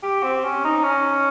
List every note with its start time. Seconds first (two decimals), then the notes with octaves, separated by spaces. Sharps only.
0.03 G4
0.23 C4
0.44 C#4
0.64 D#4
0.83 C#4